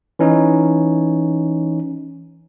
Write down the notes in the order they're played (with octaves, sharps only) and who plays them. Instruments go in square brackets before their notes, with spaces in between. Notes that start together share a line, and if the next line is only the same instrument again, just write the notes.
[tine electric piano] E3 C#4 D#4